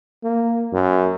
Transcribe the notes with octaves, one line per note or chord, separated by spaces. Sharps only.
A#3
F#2